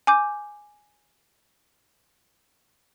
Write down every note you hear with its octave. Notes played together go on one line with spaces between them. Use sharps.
G#5 D6 G6